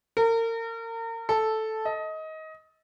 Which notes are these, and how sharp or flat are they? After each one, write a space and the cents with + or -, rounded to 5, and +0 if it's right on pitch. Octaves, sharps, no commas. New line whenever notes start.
A#4 -35
A4 -5
D#5 +20